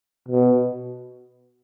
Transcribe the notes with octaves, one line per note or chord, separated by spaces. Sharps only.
B2